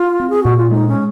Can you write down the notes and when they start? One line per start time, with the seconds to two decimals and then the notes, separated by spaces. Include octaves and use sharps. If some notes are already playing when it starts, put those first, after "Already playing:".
Already playing: F4
0.20 C4
0.30 G#4
0.43 A#2 F#4
0.57 F4
0.71 G#3 D#4
0.88 C#4